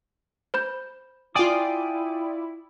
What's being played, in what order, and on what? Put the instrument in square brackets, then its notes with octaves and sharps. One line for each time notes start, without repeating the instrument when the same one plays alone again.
[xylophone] C5 B5 G6
[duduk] E4 [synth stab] F4 D5 [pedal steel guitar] G5 G#5 D#6